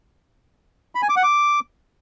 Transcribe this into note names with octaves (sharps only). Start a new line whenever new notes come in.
B5
G#5
D6
F#5
D6